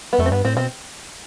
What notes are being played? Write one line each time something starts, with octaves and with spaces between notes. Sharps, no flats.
B3
F2 A3
C4
G2 B3
A2 C4
B2 C4